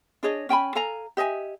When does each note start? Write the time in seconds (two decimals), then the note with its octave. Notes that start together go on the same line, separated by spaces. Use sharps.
0.23 D4 G#4 C#5 D#5
0.49 C#4 G5 G#5 B5
0.75 A4 F5 G#5 A#5
1.17 G4 D#5 E5 G#5